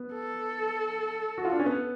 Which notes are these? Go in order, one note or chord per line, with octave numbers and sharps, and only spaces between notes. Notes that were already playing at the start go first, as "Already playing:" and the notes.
Already playing: B3
A4
F#4
F4
D4
C#4
B3